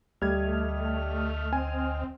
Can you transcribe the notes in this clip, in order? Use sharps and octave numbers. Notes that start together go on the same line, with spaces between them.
D2 G3 A3 D#5 F6 G#6
C4 G#5